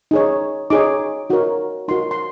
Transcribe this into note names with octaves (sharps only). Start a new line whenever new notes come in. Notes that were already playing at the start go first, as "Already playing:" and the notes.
D#4 G#4 C#5
D#4 G#4 C#5 D6
D#4 F#4 A#4 C#5
D#4 F#4 A#4 C#5 C6
C6